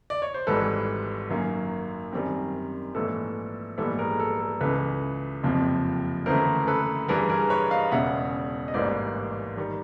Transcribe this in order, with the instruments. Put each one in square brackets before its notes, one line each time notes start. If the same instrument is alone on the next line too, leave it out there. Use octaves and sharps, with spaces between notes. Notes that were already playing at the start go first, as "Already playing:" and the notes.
[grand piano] D5
C#5
C5
G#1 G#2 E3 G3 A4 B4
F#2 D#3 F#3 A#3 C#4
F#2 D#3 G3 C4
A#1 G#2 E3 A3 A4
A#1 G#2 E3 G3 B3 A4
G#4 A#4
A4
A4
C#2 C#3 E3 A4 B4
F#1 F2 C3 F3
D2 C#3 E3 A3 A#4 C5
A4 B4
G2 E3 G3 G#4 A#4
G#4 A#4
B4 C#5
D#5 F5
E1 E2 C#3 E5 F#5
D#5
A1 G#2 E3 G3 A#3 C5 D5
D#3 G3